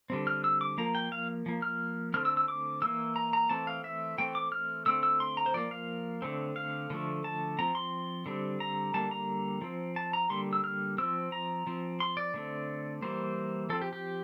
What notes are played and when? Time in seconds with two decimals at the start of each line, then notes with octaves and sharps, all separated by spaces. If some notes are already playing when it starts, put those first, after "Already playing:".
0.10 D3 G3 C4
0.27 F6
0.44 E6
0.61 D6
0.78 F3 A#3 A#5
0.95 G5
1.12 F5
1.46 F3 A#3
1.62 F6
2.14 D3 A3 C4 F6
2.25 E6
2.37 E6
2.48 D6
2.82 E3 A#3 E6
3.16 A#5
3.33 A#5
3.50 E3 A3 C4 A5
3.67 F5
3.84 E5
4.18 E3 A3 C4 G5
4.35 D6
4.52 F6
4.86 D3 A3 C4 E6
5.03 E6
5.20 C6
5.37 A#5
5.46 C5
5.54 F3 A#3 D5
5.71 F5
6.22 D3 A3 C4
6.56 F5
6.90 D3 F3 A3
7.24 A5
7.59 F3 C4 A#5
7.75 C6
8.26 D3 G3 C4
8.60 A#5
8.94 D3 G3 A#3 A5
9.11 A#5
9.62 F3 C4
9.96 A5
10.13 A#5
10.30 D3 G3 A#3 C6
10.53 E6
10.64 F6
10.98 F3 C4 E6
11.32 A#5
11.67 F3 C4
12.00 C6
12.17 D5
12.34 D3 A3 C4
13.02 E3 G3 A#3 C5
13.70 F3 C4 A4
13.81 G4
13.93 G4